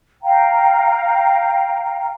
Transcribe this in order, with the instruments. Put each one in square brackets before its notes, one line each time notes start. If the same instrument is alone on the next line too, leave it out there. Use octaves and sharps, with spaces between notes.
[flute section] F5 G5 A#5